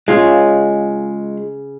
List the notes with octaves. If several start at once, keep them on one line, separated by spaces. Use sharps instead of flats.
C#3 G#3 F4